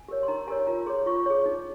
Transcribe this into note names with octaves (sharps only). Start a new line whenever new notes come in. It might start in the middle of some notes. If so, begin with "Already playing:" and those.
Already playing: G#5
G4 A#4 C#5
C6
D#4 A#5
G4 A#4 C#5 G#5
F4 A#5
G#4 C#5 C6
F4 C#6
G#4 C#5
D#4